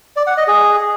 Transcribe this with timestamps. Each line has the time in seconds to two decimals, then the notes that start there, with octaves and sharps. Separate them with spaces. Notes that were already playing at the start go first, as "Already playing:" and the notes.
0.16 D5
0.27 F#5
0.37 D#5
0.48 G#4